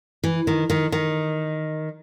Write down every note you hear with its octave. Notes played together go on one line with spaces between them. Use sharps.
E3
D#3
D#3
D#3